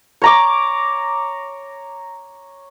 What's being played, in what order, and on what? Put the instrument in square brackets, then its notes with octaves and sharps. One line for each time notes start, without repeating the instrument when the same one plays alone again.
[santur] C#5 A#5 D6